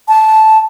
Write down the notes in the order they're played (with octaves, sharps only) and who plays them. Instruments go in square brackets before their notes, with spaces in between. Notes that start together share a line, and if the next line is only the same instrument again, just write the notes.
[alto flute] A5